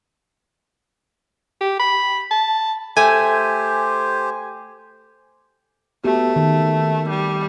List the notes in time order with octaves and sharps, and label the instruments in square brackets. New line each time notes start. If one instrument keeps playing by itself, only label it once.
[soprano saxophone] G4
B5
A5
[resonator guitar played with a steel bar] A3 [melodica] G4 C5 [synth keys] G#5
[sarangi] A3 [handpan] B3 F#4 G4
[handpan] D#3
[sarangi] G3